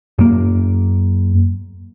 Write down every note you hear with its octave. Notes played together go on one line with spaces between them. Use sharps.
F#2 A#3